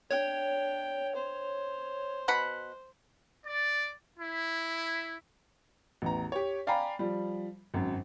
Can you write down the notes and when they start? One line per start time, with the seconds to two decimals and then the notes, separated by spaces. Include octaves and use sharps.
0.11 D4 C#5 G5
1.15 C5
2.28 B2 F#5 B5
3.45 D5
4.18 E4
6.02 A1 E2 A#5
6.32 G4 C#5
6.67 D5 F5 G5 G#5 A#5 B5
6.99 F3 G3
7.74 G#1 F#2